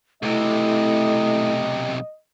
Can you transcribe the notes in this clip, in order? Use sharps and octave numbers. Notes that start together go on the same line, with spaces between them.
B1 C3 A3 E4 D#5